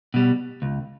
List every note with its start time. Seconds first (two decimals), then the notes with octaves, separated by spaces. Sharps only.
0.14 B2 G3
0.62 C#2